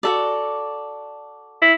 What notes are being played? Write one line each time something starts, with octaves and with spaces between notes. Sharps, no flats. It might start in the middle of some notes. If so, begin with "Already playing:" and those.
F#4 A4 D5
E4